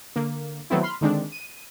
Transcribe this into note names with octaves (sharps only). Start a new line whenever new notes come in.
D3 A#3
D#3 F#3 A3 B3 C4 E4
B5 C6 F6
D3 D#3 G#3 C4 D4
D#7